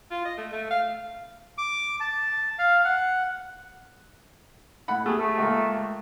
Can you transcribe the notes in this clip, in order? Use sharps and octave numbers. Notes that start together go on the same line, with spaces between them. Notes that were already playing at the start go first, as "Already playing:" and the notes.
F4
D#5
A3
A3
F5
D6
A5
F5
F#5
A2 F#5 B5
A3 G4 G#4
A3 A4
C#2 A#3